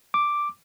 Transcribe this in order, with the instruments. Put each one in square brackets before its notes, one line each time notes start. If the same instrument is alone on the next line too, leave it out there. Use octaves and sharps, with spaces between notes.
[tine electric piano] D6